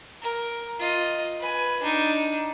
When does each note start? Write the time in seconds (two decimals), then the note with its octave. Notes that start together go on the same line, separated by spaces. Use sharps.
0.23 A#4
0.80 F4 D#5
1.40 B4 G#5
1.82 D4 D#4